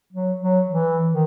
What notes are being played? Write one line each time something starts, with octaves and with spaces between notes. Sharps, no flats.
F#3
F#3
E3
D#3